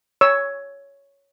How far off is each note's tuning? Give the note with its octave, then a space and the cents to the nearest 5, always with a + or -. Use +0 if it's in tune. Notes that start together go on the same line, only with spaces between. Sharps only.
C#5 +10 E6 +0